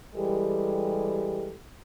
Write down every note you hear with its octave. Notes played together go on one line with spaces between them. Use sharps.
E3 G3 G#3 G4 A4